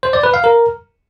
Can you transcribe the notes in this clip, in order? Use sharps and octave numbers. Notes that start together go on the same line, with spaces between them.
C5
D5
B4
F5
A#4